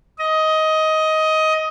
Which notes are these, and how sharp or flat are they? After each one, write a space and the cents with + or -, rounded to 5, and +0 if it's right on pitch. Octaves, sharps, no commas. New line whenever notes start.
D#5 +15